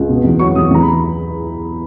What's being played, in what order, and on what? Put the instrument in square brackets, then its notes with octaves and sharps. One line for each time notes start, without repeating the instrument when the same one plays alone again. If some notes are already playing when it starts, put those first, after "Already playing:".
Already playing: [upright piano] C#2
B2
E2
F#3 C#6
E2 D#6
E2 A#5
B5